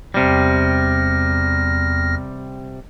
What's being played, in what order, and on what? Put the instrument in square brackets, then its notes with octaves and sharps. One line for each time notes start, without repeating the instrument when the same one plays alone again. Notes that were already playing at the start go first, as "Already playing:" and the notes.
[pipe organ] E2 F6 A#6 [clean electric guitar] C3 G3